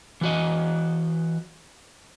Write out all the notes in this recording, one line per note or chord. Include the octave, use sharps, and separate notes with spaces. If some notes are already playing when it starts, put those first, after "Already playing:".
E3 F#4 D#5